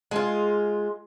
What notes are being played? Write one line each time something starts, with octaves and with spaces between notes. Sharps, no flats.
G#3 F4